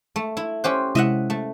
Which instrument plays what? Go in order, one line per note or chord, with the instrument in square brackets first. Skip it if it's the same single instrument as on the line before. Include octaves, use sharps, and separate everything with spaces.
[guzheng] A3
E4
[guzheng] C#4 G4 C5 [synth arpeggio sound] F#6
[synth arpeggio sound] C3 G#3 E4 [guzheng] D#5 E5 F#5
[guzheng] A3